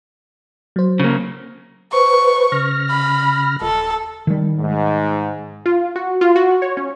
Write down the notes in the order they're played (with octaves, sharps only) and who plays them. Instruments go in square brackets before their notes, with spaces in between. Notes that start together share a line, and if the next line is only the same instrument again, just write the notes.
[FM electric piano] F#3 C5
[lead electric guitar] C#3 A#3
[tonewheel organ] B4 C5 [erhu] C#6
[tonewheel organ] C#3 F6 A#6
[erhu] B5
[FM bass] D#1 [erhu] A4
[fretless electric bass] D#3 G3
[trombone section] G#2
[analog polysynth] F4
F#4
F4
F#4
C#5
C#4